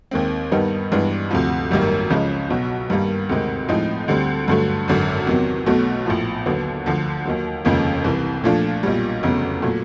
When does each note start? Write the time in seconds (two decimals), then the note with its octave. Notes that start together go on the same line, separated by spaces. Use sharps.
0.11 D#2 D#3 G#3 C4
0.51 G2 D#3 G3 B3 D#4
0.91 G2 E3 G#3 B3 D4
1.31 D2 C3 F3
1.71 G#1 F#2 D#3 G3 A#3
2.10 C#2 C#3 F3 G#3
2.50 B1 B2 F#3
2.90 G2 D#3 G3 A#3
3.29 D2 C3 D#3 G#3 C4
3.69 A2 F3 G#3 C4 D#4
4.08 D2 D3 G3 C4
4.48 G2 D3 F#3 A3
4.88 G#1 F#2 D3
5.27 E2 C3 D#3 F#3
5.66 B1 B2 F#3 A3
6.06 A#1 A2 F3
6.46 D#2 D3 F#3 B3
6.86 D2 D3 F3
7.25 D#2 D#3 F#3
7.65 F1 D#2 C#3 F3 G#3
8.04 C2 C3 E3
8.44 A#2 F3 A3 D4 F4
8.83 B1 A#2 G3
9.23 F1 E2 C#3 F#3
9.62 A#2 F#3 A3